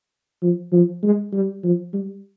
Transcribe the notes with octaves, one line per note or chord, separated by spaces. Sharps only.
F3
F3
G#3
G3
F3
G3